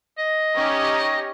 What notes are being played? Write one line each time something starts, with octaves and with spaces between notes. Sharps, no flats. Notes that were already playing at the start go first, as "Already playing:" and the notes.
D#5
C#4 D#4 G4